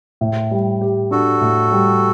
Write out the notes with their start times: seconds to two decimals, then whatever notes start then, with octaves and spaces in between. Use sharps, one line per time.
0.21 A2
0.51 G3
0.81 G4
1.11 D4 F#4 A4
1.41 A2
1.72 G3